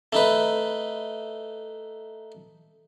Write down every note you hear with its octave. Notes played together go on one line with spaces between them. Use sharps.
A3 D#4 B4